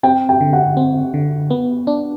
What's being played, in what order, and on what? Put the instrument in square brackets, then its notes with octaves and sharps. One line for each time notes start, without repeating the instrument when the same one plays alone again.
[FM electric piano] C4 [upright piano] G5
[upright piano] G5
[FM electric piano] D3
[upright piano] F#5
[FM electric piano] C4
D3
B3
D4